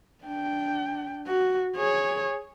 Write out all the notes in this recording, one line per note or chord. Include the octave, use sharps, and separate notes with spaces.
D4 G5
F#4
G#4 C#5